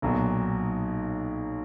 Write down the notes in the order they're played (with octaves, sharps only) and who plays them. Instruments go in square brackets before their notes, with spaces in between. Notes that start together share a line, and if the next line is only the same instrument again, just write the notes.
[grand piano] B1 A#2 F#3 B3